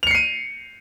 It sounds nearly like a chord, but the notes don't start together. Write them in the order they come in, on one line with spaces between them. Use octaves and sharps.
F7 C#7 C7 D#7